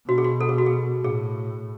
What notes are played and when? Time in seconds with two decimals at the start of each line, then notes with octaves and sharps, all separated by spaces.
0.08 B2 F#4
0.18 G#4
0.24 F#4
0.41 A4
0.49 G#4
0.58 F#4
0.66 G#4
1.04 A2 G#4